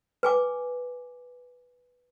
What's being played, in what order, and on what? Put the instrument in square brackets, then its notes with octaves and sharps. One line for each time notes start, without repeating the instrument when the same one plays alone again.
[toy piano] B4 G#5 D6